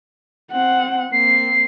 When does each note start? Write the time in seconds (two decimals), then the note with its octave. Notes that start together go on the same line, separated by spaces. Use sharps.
0.51 C4 F#5
1.12 A#3 C4 C7